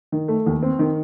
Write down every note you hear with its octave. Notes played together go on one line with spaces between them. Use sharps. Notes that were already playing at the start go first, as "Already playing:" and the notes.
D#3
A3
D#2
C4
D#3